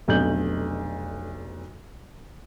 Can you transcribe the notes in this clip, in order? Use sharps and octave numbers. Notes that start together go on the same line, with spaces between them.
F1 B1 A3 D4 G6 F#7